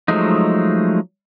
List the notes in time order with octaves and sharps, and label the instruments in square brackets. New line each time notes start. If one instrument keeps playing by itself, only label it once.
[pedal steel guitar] F3 F#3 G#3 A3 D#4